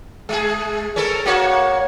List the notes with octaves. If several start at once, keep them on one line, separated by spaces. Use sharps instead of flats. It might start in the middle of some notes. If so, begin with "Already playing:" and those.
G#3 G#4
C#4 A4 A#4
A#3 F#4 C#5